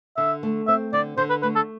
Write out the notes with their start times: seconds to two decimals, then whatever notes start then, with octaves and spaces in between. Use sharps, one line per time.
0.17 D3 E5
0.43 A3
0.67 C4 E5
0.93 D3 D5
1.18 D3 C5
1.30 B4
1.42 A3 B4
1.56 A4